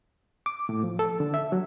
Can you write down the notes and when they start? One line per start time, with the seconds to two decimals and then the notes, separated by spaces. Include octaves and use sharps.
0.46 D6
0.69 A2
0.83 F3
0.99 A4
1.20 D3
1.34 E5
1.52 F#3